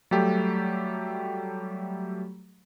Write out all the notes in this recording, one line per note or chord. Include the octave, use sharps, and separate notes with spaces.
F#3 G3 A3 G4 A4